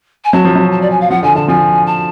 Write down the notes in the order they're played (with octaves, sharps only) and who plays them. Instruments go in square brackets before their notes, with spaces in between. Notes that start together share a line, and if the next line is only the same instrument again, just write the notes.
[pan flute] G#5
[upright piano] F#3 [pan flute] A5
[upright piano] F3
F#3
[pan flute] A5
D5
G#5
F5
[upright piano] F3 [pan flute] F#5
[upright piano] D3 [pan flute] G#5
[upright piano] D3 [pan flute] A5
[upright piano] F3 [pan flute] G#5
[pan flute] A5